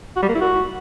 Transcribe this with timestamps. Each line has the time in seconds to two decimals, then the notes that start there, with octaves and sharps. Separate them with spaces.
0.17 F#4
0.23 G3
0.29 A#3
0.35 E4
0.41 F#4